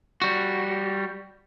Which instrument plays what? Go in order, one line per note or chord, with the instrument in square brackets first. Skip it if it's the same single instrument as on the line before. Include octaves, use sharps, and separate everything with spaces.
[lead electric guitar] G3 F#4